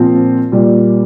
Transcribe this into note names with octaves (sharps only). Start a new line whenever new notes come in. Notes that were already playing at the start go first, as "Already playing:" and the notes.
Already playing: A#2 F3 C4 F4 C5
A#2 G3